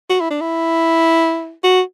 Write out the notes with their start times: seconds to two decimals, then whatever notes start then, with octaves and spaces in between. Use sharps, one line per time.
0.10 F#4
0.20 E4
0.31 D4
0.41 E4
1.63 F#4